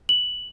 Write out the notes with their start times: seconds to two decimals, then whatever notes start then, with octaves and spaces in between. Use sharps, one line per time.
0.09 F#7